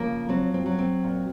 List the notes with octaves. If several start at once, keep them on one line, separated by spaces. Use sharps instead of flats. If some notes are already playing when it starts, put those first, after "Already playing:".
Already playing: C#3 F3 A#3
F#3 C4
C4
F#3
C4
A#2